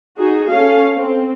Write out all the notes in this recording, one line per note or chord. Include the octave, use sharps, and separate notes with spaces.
D#4 F#4 G#4
C#4 A4 F5
C4